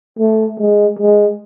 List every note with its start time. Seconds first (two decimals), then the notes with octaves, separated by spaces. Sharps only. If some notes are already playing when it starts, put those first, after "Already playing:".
0.19 A3
0.59 G#3
0.99 G#3